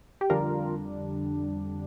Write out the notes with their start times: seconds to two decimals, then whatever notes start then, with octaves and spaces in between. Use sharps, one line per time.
0.21 G4
0.30 F2 D3 G3 D4 F4 A#4